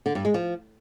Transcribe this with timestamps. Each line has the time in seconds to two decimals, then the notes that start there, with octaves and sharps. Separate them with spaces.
0.06 D3
0.15 G2
0.25 G#3
0.34 F3